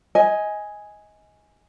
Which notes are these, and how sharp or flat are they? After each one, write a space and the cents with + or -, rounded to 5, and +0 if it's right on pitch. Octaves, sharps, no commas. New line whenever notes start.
D#5 +20 G#5 +0